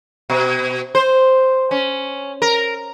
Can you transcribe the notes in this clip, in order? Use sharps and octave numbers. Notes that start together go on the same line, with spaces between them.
B2
C5
C#4
A#4